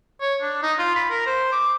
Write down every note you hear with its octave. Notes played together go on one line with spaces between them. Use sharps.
C#5
D4
D#4
F4
B5
A#4
C5
D6